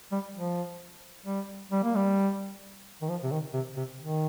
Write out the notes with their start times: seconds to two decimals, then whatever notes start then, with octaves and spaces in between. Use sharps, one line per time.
0.12 G3
0.35 F3
1.26 G3
1.71 G3
1.83 A#3
1.95 G3
3.02 D#3
3.09 F3
3.23 C3
3.31 D#3
3.53 C3
3.76 C3
4.00 D#3